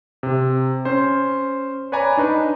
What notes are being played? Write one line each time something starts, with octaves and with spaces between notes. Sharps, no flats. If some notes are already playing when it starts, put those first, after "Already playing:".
C3
C#4 C5
B4 C#5 D5 G#5 A#5 B5
D4 D#4 B4